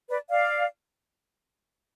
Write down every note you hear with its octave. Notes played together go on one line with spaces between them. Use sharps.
B4 D5
D5 F5